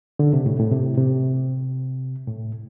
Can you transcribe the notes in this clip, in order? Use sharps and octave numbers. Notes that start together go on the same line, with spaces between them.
D3
C3
A2
A2
C3
C3
A2